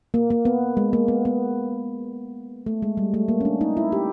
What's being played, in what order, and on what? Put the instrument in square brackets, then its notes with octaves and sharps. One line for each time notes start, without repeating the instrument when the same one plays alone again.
[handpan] A#3
A#3
B3
G#3
A#3
B3
B3
A3
G#3
G3
A3
A#3
C#4
D4
D#4
E4
G4